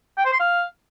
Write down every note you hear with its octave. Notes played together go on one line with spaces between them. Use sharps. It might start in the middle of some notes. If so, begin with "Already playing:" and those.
G5
C5
C6
F5